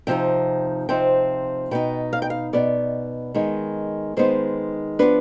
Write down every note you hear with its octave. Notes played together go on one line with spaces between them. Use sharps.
C3 F3 C4 D#4 G5
C3 F3 C4 D#4 G5
B2 B3 D#4 G5
F5
G5
F5
B2 B3 D#4 D5
D#3 G#3 B3 D#4
D#3 G#3 B3 D#4 C5
F3 B3 D4 B4